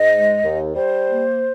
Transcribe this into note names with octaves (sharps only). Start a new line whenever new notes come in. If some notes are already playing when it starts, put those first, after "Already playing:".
Already playing: G#2 D#5
G#3
D#2
G3 C5
A#3